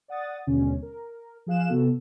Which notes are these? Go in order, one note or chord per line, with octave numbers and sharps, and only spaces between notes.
D5 F#5 D#6 A6
D#2 B2 D3 G#3 C#4
A#4
F3 G#4 F5 F#6 E7
C3 B3 F#4 A4